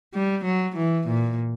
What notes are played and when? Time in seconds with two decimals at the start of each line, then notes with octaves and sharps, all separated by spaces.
0.14 G3
0.45 F#3
0.77 E3
1.08 A#2